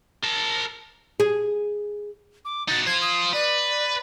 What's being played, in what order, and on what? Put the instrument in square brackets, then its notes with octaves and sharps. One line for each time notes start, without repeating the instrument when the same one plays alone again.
[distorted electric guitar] A#4 A5
[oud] G#4
[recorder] D6
[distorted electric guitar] D#4 F#4 [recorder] A6
[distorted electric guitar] F4 C5 [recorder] G#6
[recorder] D#6
[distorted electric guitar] B4 [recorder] D5